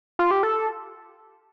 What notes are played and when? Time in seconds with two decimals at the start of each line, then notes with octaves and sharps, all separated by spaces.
0.19 F4
0.31 G4
0.43 A4